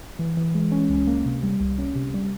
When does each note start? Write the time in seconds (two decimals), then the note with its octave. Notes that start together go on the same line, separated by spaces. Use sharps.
0.19 E3
0.37 E3
0.54 G#3
0.72 C#4
0.89 C#2
1.07 A#3
1.26 C3
1.43 G3
1.60 C2
1.78 C#4
1.96 C3
2.14 G3